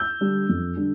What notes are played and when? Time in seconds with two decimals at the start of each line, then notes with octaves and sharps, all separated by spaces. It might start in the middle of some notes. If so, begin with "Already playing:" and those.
Already playing: E6 G6
0.21 D3 G3 D4
0.49 F2
0.77 D3 G3 D4